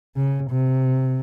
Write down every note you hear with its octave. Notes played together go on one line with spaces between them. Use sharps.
C#3
C3